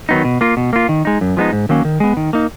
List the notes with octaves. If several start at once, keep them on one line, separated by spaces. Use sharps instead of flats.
D#3 F#3 B3 D#4
B2
A#3 F4
B2
A#3 F4
D#3
G#3 D#4
F#2
F3 G#3 B3 D#4
G#2
D#3 F#3 A#3 C#4
D#3
G#3 B3
D#3
A#3 D#4